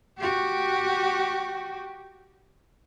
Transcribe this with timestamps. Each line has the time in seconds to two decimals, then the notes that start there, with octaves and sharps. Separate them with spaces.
0.18 F#4 G4